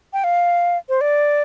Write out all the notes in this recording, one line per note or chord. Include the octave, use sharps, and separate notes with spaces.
G5
F5
C5
D5